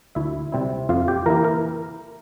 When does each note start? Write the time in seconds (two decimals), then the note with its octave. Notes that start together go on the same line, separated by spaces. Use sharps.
0.15 D2 E4 E5
0.52 C3 G3 C4 E4
0.89 F2 F4 F5
1.08 G4 G5
1.26 E3 A#3 E4 A#4 A#5
1.44 A#4 A#5